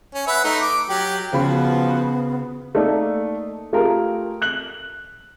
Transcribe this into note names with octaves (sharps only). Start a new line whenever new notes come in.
C#4
B4 E5 F#5
A3 D#4
D6
F#3 G4
C#3 F3 B3 F#4 B5
A3 A#3 D#4 D5
A3 F4 G4 G#4 A#4
F#6 F#7